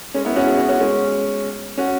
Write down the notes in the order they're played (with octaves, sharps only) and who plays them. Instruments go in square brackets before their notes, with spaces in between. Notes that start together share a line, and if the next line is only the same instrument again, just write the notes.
[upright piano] G#3 C#4
B3 E4
C#4 F#4
E4 G#4
C#4 F#4
C#4 F#4
G#3 C#4
C#4 F#4